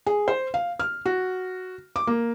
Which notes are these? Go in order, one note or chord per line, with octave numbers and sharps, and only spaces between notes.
G#4
C5
F5
F6
F#4
D6
A#3